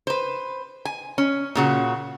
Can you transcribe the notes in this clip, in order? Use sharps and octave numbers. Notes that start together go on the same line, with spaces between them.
B4 C5
G#5
C#4
A#2 C#3 F#4